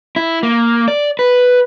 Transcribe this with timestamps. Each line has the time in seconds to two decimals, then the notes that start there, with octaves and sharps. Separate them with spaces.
0.16 E4
0.43 A#3
0.88 D5
1.19 B4